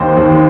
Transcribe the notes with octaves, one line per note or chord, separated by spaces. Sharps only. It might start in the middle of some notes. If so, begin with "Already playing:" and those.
Already playing: D#2 D#3 C5
D#2